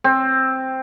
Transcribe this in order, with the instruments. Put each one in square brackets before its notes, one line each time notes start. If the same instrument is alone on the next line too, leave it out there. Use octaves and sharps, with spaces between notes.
[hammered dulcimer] C4